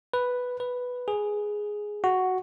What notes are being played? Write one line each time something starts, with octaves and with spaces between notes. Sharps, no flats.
B4
B4
G#4
F#4